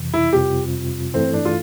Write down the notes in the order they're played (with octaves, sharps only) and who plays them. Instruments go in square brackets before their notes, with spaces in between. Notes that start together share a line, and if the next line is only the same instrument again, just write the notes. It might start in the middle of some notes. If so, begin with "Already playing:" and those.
Already playing: [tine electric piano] F2 C3 E3
[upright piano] E4
[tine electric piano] F2 C3 G3 C4 F4 [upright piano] G4
[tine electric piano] G2 E3 A3 E4 A4 [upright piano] C4
[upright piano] D4
F4